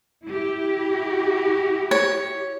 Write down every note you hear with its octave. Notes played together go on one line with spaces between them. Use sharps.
E4 G4
C#5